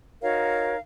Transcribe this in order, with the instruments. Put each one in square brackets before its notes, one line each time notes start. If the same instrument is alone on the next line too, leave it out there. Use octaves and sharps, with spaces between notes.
[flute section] D#4 F#4 A#4 C#5 F5